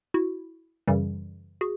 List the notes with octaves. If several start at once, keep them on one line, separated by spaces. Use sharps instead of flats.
E4 F#4
F#2 C#3 E3 G3
F#4 G#4